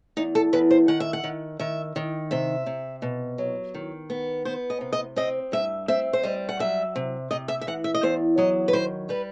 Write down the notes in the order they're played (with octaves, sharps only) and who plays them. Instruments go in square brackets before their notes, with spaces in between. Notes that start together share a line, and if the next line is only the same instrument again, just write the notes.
[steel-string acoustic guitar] E2 D#4
A4
E2 B4
C5
D#3 F#5
E5
F#5
D#3
D#3 E5
D#3
C3 E5
C3
B2
F#3
D#3
B3
B3 C5
D#5
C3
D#5
C4 D#5
G2 E5
C4 E5
C5
G3 D#5
F#5
F#3 E5
C3
C3 D#5
E5
E5
E3 F#5
E5
D#5
E2 C5
F#3 D#5
B4
D#3 C5
G3 B4